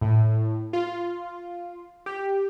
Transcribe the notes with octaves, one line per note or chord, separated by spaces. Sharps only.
A2
F4
G4